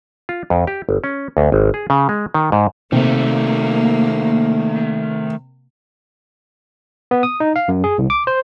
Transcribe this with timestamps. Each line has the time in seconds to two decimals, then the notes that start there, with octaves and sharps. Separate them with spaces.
0.29 F4
0.50 F2
0.67 G4
0.89 G1
1.04 C#4
1.37 D2
1.52 G#1
1.74 G#4
1.90 C#3
2.09 G#3
2.34 D#3
2.52 G#2
2.92 C3 D#3 A3 A#3
7.11 B3
7.23 D#6
7.40 D#4
7.56 F5
7.68 F#2
7.84 G#4
7.98 C2
8.10 D6
8.27 C5